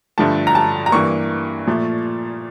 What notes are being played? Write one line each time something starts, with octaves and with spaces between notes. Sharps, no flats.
G2 D3 F3 A3 A5
A#5
A5
A#5
G2 E3 A#3 C#6
A#2 F3 A3